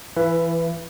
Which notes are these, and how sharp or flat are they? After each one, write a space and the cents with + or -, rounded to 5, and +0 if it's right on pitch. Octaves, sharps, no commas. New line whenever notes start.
E3 +15 B4 +0 E5 +35